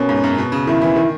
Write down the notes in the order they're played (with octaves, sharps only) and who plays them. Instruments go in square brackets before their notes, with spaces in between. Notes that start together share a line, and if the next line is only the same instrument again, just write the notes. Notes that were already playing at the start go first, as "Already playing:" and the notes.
Already playing: [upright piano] B2 A#3 [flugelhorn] C#4
[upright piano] G#2
F#2
B2
C#3
[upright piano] D#3 [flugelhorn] E4
[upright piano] E3
D#3